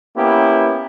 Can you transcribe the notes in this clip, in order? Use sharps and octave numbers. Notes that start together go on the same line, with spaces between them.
A#3 B3 C#4 E4 G4